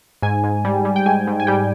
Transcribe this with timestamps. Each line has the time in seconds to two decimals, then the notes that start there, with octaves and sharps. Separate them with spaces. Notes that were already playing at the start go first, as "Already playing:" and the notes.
0.22 G#2 G#5
0.44 G#2
0.65 G3
0.85 G3
0.96 G5
1.06 G#2 G#5
1.27 G#2
1.40 G#5
1.47 G3 G5